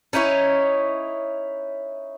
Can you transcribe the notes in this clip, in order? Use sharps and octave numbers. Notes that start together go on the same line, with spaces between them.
C#4 D#4 E4 C#5